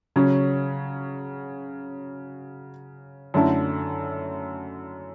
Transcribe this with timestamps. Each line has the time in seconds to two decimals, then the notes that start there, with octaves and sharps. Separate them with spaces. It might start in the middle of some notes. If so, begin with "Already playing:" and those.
0.16 C#3 F#3 C#4
3.34 F#2 D3 A3 E4 A4